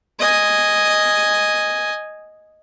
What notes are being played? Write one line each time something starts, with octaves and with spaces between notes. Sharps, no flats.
D#5 G#5